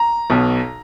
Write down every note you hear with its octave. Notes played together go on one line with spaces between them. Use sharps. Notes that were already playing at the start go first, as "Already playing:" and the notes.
Already playing: A#5
B1 B2